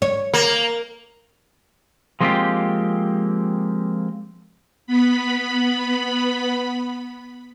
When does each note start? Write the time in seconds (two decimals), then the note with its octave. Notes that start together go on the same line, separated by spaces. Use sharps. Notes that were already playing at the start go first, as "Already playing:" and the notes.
0.02 C#5
0.34 A#3
2.20 F3 G#3 A#3 C4 F4 G4
4.87 B3 B5